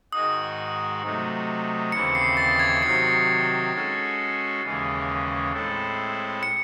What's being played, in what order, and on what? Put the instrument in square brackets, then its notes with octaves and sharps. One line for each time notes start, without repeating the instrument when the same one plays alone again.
[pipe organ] G#2 D#3 G#3 D#4 F#4 [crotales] D#6
[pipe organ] C3 F#3 A3 D#4
[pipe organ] D#2 C#3 E3 C4 E4 [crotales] C#7
[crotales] C7
A6
G#6
[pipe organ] C3 D#3 F#3 C4 [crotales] C7
[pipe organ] G#3 C#4 F#4 A4
D#2 C#3 E3 G#3 C#4
A2 G#3 C4 E4 A4
[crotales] C#7